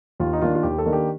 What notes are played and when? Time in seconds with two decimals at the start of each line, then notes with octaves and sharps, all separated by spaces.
0.20 D#2 F4
0.33 D#4
0.41 D#3 A#3 D4 F4
0.55 F4
0.63 D#2 G4
0.78 A4
0.86 D#3 A#3 D4
0.93 G4